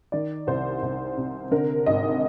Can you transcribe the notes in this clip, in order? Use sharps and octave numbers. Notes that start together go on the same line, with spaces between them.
D#3 D5
C2 C5
C2
C3
D3 A#4
G#1 D#5